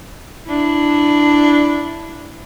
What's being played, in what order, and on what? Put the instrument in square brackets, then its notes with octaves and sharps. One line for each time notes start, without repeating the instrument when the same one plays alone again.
[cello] D4 E4